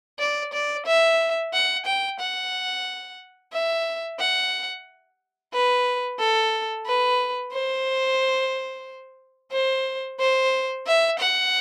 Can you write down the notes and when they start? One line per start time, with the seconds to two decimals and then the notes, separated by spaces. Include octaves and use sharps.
0.19 D5
0.53 D5
0.86 E5
1.53 F#5
1.86 G5
2.19 F#5
3.53 E5
4.19 F#5
5.53 B4
6.19 A4
6.86 B4
7.52 C5
9.52 C5
10.19 C5
10.87 E5
11.19 F#5